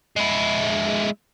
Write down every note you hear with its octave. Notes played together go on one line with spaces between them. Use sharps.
G#3 E4